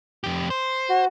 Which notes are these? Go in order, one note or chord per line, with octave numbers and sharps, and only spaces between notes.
F2 G4
C5
F#4